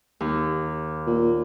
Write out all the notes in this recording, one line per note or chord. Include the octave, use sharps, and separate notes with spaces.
D#2
A#2